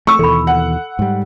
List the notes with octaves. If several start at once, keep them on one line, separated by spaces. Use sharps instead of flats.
A3 C#6 E6
D#2 B2 E3 A4 B5
F#5
G#2 G3